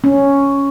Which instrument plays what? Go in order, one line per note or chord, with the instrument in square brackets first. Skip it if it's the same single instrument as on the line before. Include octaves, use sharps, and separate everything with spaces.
[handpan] C#4